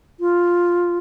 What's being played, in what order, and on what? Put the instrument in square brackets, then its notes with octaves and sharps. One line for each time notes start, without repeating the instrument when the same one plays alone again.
[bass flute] F4